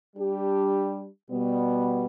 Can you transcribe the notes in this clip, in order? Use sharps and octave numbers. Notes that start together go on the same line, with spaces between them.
G3 D4 G4
B2 G3 B3